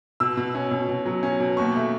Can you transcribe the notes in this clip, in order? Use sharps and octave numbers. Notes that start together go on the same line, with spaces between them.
B2 E6
B2
C#4
B2
B2
F#3
C#4
B2
D#2 C#6
A3